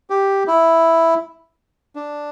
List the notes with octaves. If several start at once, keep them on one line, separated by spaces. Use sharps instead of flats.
G4
E4
D4